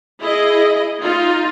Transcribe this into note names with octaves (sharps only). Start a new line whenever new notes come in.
E4 G#4 D#5
D#4 F4